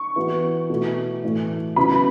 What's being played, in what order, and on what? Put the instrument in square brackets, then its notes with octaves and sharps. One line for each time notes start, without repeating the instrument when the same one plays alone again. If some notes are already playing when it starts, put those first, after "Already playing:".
Already playing: [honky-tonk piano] C#6
[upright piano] E3 B3 F#4
B2 A3 E4
A2 E3 A3
[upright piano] C#3 F#3 B3 E4 [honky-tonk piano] B5